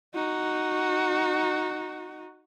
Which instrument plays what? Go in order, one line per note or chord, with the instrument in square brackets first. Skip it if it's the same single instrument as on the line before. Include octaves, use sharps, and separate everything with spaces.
[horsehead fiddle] D#4 F#4